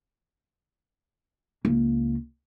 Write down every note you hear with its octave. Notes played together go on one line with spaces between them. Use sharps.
C#2 A#3